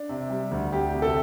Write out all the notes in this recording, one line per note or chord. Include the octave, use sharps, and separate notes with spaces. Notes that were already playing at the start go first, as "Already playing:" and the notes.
Already playing: D4
C3
G3
D2
D2 G4
C3
A4